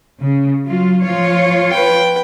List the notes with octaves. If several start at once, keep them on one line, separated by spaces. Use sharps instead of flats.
C#3
F#3 F4
F3 F4 C#5
B4 G5